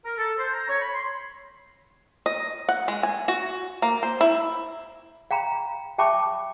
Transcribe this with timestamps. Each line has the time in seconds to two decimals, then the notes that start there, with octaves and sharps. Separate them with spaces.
0.05 A#4
0.18 A4
0.39 C5
0.53 A#5
0.69 C#5
0.82 B5
0.94 C6
2.26 D#5
2.69 F#5
2.88 G#3
3.03 G#5
3.28 F#4
3.82 A#3
4.03 C5
4.21 E4
5.31 F5 G5 A#5 B5
5.98 E5 G5 A5 B5 C#6 D6